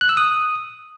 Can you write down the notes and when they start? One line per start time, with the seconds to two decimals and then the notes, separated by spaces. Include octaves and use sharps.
0.01 F#6
0.09 E6
0.17 D#6